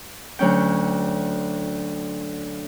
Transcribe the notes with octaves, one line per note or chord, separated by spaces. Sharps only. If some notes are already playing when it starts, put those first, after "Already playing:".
D2 F#3 C#4 G5